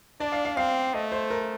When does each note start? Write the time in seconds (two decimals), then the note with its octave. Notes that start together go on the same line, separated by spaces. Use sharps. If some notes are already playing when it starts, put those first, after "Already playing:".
0.20 D4 D5
0.32 F5
0.45 F5
0.57 C4 F5
0.94 A3 D#5
1.12 C5
1.30 A#4